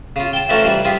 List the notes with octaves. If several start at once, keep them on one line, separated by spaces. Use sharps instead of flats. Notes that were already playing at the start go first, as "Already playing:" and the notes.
C#3 F4
G5 A5
E3 F3 A3 C#4 A4 A#4
E3 F3 G3
C4 E4 F4 G4 G#4